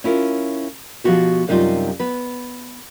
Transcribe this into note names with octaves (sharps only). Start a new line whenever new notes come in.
C#4 E4 F4 A#4
B2 F3 B3 D4 F#4 G4
F#2 C3 G3 D#4 F4
B3 B4